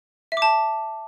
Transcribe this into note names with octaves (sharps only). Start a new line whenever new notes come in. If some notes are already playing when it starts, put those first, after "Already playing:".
E5
D6
A5